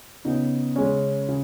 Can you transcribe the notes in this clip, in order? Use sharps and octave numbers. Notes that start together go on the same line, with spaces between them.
C#3 B3 D#4
C#3 G#3 C#4
C#3